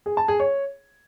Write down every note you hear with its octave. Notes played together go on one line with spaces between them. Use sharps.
G#4
A5
G#4
C#5